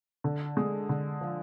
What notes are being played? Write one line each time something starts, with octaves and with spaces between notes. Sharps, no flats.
D3
G#3
D3
F3